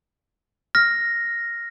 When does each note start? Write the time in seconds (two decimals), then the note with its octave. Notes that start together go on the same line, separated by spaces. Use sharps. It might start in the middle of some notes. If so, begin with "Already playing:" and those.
0.75 F6 A#6